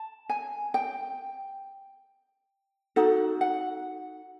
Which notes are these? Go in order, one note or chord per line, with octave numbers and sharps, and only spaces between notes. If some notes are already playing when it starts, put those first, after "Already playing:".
Already playing: A5
G#5
G5
D#4 F#4 A4 F#5
F#5